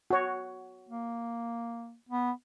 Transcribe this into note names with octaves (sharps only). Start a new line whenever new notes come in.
F#4 C#5
A#3
B3